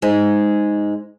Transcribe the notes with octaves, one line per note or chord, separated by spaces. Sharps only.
G#2 G#3